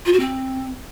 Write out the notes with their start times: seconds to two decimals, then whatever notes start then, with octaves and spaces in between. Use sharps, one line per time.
0.06 F4
0.13 F#4
0.20 C4